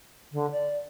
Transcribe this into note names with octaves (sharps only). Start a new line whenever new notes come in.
D3
D5